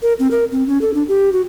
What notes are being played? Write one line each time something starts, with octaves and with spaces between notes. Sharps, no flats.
A#4
C4
A#4
C4
C#4
A4
D4
G4
F#4